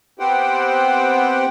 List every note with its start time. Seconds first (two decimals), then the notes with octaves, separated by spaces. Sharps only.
0.19 B3 C4 G4 C5 F#5 G5